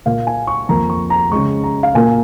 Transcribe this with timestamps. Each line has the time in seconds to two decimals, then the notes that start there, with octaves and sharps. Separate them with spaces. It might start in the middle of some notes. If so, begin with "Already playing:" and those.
0.06 A#2 A#3 F5
0.27 G#5
0.47 C#6
0.69 F2 F3 A#3 A#5
0.90 C#6
1.10 A#5
1.31 C#3 G#3 C#6
1.64 A#5
1.83 F5
1.95 A#2 A#3 G#5